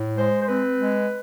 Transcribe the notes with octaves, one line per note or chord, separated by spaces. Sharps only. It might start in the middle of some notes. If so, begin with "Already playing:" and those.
Already playing: A2
G#3 C5
C5
C4 B4
G#3